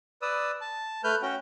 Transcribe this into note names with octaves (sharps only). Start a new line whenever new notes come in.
B4 D5 D#6 E6
A5
A3 B4 F6 G6
C#4 F#4 G5